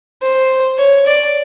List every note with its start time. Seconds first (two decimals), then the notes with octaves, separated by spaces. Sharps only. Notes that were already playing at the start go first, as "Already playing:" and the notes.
0.22 C5
0.78 C#5
1.07 D5